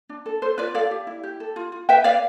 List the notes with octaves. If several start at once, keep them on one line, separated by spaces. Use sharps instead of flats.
D4
A4
A4 C5
F4 B4 D5
A4 D5 F5
G4
E4
G4
A4
F4
F4
B4 E5 G5
B4 D5 F5